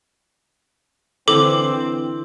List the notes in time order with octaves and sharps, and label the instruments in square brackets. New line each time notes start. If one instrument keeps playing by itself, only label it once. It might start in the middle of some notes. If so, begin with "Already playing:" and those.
[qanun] D3 E3 [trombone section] C4 [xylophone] A4 D6